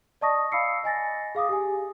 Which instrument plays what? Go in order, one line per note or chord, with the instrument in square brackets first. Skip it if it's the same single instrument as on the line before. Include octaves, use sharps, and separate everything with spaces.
[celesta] D5 D#5 A5 C#6 D#6 A#6
F5 B5 D#6 E6 C7 C#7
D#5 G#5 A6 A#6
G#4 F5 D6 D#6
G4 G#4 G#5